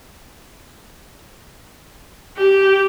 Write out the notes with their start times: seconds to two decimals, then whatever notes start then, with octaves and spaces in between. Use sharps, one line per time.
2.38 G4